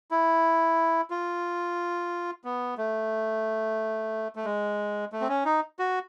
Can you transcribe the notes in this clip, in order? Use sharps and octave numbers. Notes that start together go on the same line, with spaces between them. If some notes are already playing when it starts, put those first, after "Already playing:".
E4
F4
B3
A3
A3
G#3
A3
C4
C#4
D#4
F#4